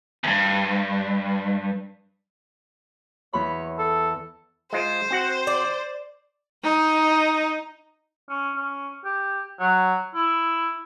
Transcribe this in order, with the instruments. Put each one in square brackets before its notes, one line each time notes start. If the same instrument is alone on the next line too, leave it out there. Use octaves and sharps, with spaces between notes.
[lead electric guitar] E2 G2
[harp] E2 B5 [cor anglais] C#5
[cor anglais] A4
[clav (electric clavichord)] G#3 F4 [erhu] C5
[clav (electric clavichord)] C4 F#4 F#5
[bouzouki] D5
[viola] D#4
[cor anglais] C#4
C#4
G4
F#3
E4